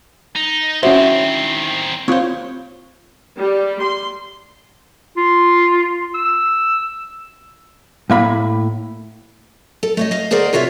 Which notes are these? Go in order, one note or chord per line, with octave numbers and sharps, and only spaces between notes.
D#4
D#3 C4 C#4 E4 F#4 C5
C4 F4 C5 C#5
G3
C6
F4
E6
A2 A#3 B5
A4
A3 C#5 D#5
D#5 F5
D2 G#4 A#4 C5 D5 F#5
C3 F4 F#4 C#5 E5